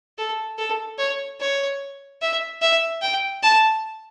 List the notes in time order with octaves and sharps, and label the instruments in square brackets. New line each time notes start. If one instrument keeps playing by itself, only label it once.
[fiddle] A4
A4
C#5
C#5
E5
E5
G5
A5